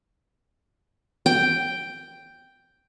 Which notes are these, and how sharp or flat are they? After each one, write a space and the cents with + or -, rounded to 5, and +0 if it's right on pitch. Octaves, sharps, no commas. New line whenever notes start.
G5 +0